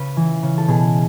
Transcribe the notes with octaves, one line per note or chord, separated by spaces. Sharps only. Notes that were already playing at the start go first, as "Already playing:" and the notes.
Already playing: C#3 B4
E3
C#3
A4
B2 G#4